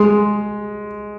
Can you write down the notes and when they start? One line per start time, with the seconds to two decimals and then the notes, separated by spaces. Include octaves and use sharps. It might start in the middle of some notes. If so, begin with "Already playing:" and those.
Already playing: G#3